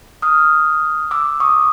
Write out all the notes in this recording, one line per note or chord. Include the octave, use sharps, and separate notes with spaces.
D#6 F6
D6 E6
C#6 D#6